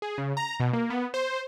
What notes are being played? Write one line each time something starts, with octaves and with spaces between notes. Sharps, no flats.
G#4
C#3
A#5
B2
A#3
B3
C5